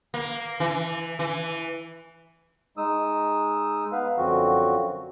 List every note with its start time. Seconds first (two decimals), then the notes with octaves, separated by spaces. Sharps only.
0.14 A#3
0.60 E3
1.19 E3
2.77 G#3 D#4 D#6 E6
3.92 B3 B4 F5
4.18 F#2 D3 F3 C4 F#4